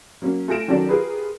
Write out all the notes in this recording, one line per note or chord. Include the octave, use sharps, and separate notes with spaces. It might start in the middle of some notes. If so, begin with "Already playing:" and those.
F#3 A#3 C#4
A3 F4 G#5 A#6 D7 E7
D#3 F#3 C#4 A4 D5
F4 G4 G#4 A#4 B4